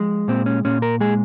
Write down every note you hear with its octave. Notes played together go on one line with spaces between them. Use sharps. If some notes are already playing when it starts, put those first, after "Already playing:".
Already playing: F3 G#3
A#2 C4
C#4
A#2 C#4
A#4
G#3 G#4